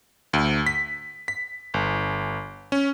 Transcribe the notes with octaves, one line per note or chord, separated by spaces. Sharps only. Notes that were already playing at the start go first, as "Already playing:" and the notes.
D2
B6
B6
G1
C#4